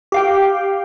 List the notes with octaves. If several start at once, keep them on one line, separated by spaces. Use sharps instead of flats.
G4 F5 G5